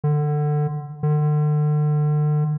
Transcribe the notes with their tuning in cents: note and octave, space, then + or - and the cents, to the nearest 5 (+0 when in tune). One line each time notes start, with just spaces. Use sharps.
D3 +20
D3 +35